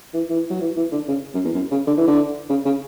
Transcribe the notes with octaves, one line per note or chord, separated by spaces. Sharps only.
E3
E3
F#3
E3
E3
D3
C#3
F#2
E2
F#2
C#3
D3
E3
D3
C#3
C#3